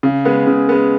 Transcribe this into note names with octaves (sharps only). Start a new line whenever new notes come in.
C#3
G#3 B3
C#3
G#3 B3